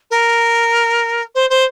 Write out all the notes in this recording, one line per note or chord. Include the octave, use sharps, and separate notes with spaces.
A#4
C5
C5